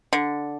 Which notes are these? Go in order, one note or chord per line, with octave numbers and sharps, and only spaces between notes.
D3